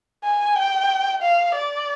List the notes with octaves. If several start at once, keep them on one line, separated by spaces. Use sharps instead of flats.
G#5
G5
F5
D5